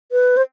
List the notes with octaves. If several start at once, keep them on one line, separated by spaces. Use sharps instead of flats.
B4
C5